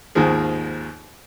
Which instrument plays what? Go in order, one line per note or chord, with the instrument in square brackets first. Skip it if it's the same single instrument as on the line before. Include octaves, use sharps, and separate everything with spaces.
[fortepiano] D#2 G#2 D#3 F3 G#4